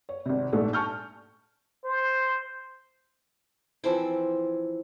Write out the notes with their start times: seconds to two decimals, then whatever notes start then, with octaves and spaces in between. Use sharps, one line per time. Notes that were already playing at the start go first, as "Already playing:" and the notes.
0.09 C#5
0.26 G#1 C3
0.52 A#1 G#2 A3
0.73 G#5 A5 C#6 F6 G6
1.84 C5
3.84 E3 F3 C4 E4